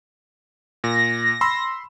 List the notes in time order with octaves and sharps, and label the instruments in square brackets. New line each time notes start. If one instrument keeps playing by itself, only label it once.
[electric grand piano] A#2 [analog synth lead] A#6
[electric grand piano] B5 C6 E6